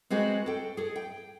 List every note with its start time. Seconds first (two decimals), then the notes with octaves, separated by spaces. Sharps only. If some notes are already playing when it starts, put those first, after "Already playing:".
0.10 G#3 C4 F#4 G#4 B4 C5
0.46 A4 G5
0.77 G#4 A4
0.96 G5